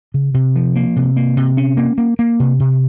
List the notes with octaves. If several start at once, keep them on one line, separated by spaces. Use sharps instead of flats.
C#3
C3
F3
A#3
C3
A#3
C3
C#4
A#3
A#3
A#3
C3
C3